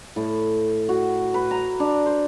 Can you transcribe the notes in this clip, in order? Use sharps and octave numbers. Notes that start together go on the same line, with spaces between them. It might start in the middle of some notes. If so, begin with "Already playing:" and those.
A2
F#4
B4
A#5
D4
C5